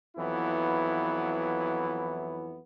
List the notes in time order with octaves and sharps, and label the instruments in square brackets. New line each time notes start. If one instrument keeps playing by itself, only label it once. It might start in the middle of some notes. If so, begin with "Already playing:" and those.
[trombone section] F2 E3 F#3 B3 E4